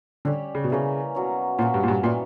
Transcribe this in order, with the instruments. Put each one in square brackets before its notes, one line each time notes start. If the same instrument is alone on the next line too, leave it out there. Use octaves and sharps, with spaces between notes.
[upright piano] D3 [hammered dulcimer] G3 C#4 G4
[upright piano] C#3
B2
[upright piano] C#3 [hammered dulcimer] E3 A#3 C#4
[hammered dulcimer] B2 F#3 C#4
[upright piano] A#2 [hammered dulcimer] F#3 A#3 C#4
[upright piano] G2
A#2
G2
[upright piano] A#2 [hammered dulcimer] E3 G3 B3